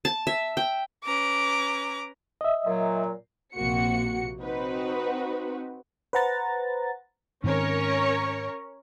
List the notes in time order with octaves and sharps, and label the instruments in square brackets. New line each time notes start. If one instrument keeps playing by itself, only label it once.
[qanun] A5
E5
G5
[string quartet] C#4 B4 A#5 [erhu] D6
[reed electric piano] D#5 E5
[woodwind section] A#2 F#3
[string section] A#1 C3 A#3 F#4 C#7
C4 D#4 F#4 B4
[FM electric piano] B4 C5 F#5 A#5 A6
[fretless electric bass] G#2 D#3 C4 [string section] C#4 A#4 C#5